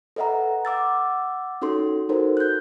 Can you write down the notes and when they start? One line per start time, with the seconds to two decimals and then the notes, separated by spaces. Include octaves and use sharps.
0.16 A4 B4 D#5 E5 F#5 A#5
0.65 F#5 D6 E6 A6
1.62 C#4 D#4 F#4 A4 C6
2.09 D#4 F#4 A4 A#4 C5
2.37 F#6 G6